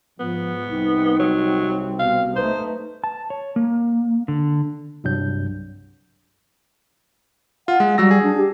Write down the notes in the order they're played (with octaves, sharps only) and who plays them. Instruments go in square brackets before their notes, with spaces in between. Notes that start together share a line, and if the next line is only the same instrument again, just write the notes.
[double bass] G#2 [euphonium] F3 [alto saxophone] B3
[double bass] C2 C4 [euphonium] D#4
[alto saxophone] F#3
[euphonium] B2 [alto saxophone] F5
[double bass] A3 D#4 [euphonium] B4 [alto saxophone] C5
[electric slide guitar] A5
C#5
A#3
D3
[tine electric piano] C2 G2 F#3 G6
[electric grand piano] F4 [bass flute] F#5
[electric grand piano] G#3
[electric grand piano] F#3 E6 A#6 [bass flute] G3
[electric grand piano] G#4
[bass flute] D4
G4